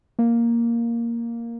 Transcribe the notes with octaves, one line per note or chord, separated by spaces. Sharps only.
A#3